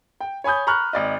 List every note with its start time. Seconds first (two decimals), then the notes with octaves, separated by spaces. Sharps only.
0.20 G5
0.44 C#5 G#5 B5 D#6 G6
0.67 A#5 B5 C#6 F6 F#6
0.93 G#1 D5 D#5